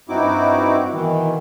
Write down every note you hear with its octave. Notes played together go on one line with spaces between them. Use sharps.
G2 C4 D#4 E4 F#4 D6
B2 D#3 E3